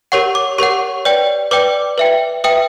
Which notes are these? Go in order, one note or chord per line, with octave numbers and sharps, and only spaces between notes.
G4 A#4 C#5 F#5 C#6
D6
G4 A#4 C#5 F#5 C#6
B4 D5 G5
B4 D5 G5 D6
B4 E5 G5
B4 E5 G5 D#6